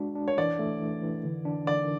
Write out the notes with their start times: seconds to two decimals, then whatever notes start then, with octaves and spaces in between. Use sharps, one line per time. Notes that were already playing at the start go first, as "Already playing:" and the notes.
Already playing: G#3 D4 F#4
0.15 D4
0.28 C#5
0.37 E3 D5
0.59 A3
0.81 E3
1.02 E3
1.24 D3
1.45 D4
1.67 D3 D5